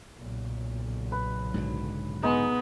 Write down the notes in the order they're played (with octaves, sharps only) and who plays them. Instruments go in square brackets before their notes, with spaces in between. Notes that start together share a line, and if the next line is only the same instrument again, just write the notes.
[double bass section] B1 A#2 C#3
[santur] B4
[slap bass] G#2 D3 F#3
[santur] G#3 D#4 [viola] B3